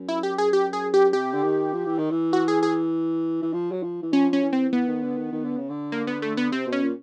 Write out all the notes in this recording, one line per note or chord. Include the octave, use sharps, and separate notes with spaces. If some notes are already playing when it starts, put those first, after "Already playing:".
Already playing: F#2
E4
G4
G#4
G4
G#4
G4
C3 G4
D3
D#3
F3
E3
D#3
E3
F#4
G#4
G#4
E3
F3
F#3
F3
E3
F3 C#4
C#4
E3
C4
E3 B3
D#3
D3
D#3
D#3
D3
C#3
D3
A#3
B3
A3
B3
C3 C4
B2
C#4
A#2